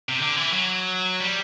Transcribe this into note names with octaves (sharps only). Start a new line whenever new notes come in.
C3
D3
E3
F#3
G3